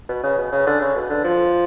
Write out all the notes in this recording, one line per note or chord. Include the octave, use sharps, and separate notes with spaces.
B2
C#3
B2
C#3
D3
C#3
B2
D3
F3